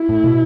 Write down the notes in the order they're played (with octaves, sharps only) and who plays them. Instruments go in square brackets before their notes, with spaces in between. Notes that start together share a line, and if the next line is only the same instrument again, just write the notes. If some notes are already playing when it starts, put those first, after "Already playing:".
Already playing: [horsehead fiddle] E4
[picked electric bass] A2
B2